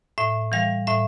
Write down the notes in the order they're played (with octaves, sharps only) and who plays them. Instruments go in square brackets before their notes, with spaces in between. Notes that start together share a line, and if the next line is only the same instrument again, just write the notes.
[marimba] A2 E5
E3 G3 F5
A2 E5